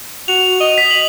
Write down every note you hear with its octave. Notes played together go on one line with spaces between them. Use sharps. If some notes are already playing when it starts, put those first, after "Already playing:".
F#4 F7
D#5
B6
F#7